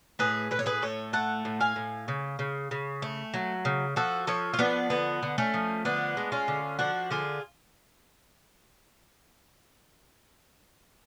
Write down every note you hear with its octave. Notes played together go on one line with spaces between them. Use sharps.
A2 G#4 B4
A2 B4
C#5
G#4 B4
A2 A4 C#5
A3 F#5 A5
A2
F5 G#5
A2
C#3
C#3
C#3
A3
F#3
C#3
F3 F#4 A4
F3 A4 C#5
F4
F3 B3 D4
D3 B3
D3
A3 C#4
F3
D3 B3 D4
G#3
C#4 F4
D3
F3 D4 F#4
D3 F4 G#4